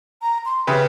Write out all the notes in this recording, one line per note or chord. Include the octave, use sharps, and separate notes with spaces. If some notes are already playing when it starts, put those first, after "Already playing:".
A#5
C6
C#3 G4 B4 E5